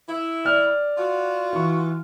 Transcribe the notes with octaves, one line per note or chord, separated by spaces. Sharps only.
E4
D5 F6
F4 F#4
E3 C#6